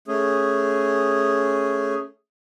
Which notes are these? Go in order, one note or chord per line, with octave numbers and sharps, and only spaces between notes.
A3 C#4 G#4